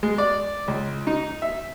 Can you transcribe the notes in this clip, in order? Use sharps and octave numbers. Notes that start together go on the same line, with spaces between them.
G#3
D5
C#2
D#4
E5